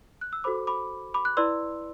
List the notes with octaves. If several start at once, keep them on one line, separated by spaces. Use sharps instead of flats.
F#6
E6
F#4 A4 C5 B5 D6
B5 D6
B5 D6
F#6
E4 B4 D5 C6 E6